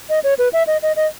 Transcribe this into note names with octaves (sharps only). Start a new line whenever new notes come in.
D#5
C#5
B4
E5
D#5
D#5
D#5